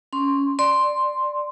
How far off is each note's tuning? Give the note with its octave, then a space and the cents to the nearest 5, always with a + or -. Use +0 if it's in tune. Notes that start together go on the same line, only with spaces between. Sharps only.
C#4 +10 C6 +0
D5 +10 C6 +0